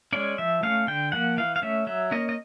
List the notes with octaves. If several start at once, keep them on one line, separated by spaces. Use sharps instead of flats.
G#3 C#4 D5
F3 E5
A3 C#4 F5
D3 G5
F3 A#3 F#5
E3 F5
F5
A3 C#4 E5
F#3 E5
A#3 C#4 D#5
D#5